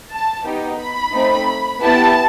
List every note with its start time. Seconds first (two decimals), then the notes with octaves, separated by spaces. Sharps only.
0.13 A5
0.47 B3 D#4 G4
0.81 B5
1.14 A3 C4 D#4
1.82 B3 E4 G4 A5